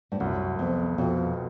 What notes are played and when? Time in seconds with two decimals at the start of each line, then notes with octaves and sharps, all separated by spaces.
0.12 G2
0.20 C2 F#2
0.59 F2 B3
0.98 F2 B2